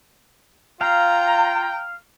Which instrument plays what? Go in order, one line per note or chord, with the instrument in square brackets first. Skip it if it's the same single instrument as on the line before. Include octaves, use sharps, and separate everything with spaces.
[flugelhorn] F4 [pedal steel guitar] F5 [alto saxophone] G5 [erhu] A#5